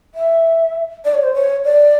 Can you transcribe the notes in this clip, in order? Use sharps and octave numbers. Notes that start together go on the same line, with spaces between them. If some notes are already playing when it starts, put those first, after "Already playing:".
E5
D5
C#5
C5
C#5
D5